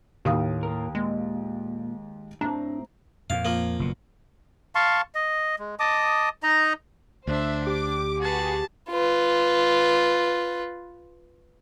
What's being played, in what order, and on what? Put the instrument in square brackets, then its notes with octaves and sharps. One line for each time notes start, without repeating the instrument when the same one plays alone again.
[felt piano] D#2 F5 D#6 [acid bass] A2
[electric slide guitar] A#3 A#4
[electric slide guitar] A#2 [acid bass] G#3
[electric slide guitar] A2 C4 [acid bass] D4 [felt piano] A#5
[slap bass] F2 A#2 [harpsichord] F5
[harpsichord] F3 A#3
[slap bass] F#1 B2
[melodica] F5 A5 C6 C#6
D#5
G#3
D#5 A5 D6 D#6
D#4 D#5 A#5
[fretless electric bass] D2 [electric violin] D4 [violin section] C5 E5
[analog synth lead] G4 [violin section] D6
[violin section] F#4 G#4 B4 [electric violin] A5
[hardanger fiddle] F4 B4